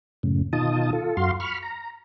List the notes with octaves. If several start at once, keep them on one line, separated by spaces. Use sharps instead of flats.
F#2 A2 C#3
B2 D#3 D#4 F4 A5 D#6
F4 A4
F#2 F#4 F5 C6
B5 C#6 F6
A#5